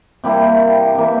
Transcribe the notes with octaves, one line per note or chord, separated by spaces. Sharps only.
C3 G3 A#3 E4
C3 E3 A#3